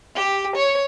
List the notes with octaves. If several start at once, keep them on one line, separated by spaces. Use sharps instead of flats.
G4
C#5